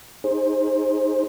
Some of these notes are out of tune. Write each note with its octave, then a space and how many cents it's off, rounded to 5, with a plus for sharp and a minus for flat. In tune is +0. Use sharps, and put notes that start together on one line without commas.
D#4 +0 G#4 +0 C5 +20